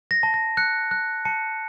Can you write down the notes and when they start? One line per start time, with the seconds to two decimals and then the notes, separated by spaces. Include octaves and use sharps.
0.11 A#6
0.23 A5
0.34 A#6
0.57 F#6 C#7
0.91 F#6
1.25 A5 C#7